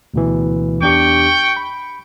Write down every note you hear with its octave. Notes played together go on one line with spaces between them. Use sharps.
D2 B2 E3
E2 D4 G4 G5 C#6
B5